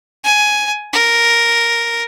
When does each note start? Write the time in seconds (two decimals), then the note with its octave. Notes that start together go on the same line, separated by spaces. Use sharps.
0.24 G#5
0.93 A#4